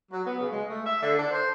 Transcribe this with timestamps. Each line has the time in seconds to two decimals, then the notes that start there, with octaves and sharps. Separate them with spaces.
0.11 F#3
0.25 B3
0.39 C#3
0.51 G#3
0.67 A3
0.85 E5
1.01 D3
1.17 D4
1.31 C5